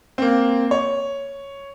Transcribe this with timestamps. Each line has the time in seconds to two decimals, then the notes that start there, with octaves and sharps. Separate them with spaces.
0.18 A#3 C4
0.71 C#5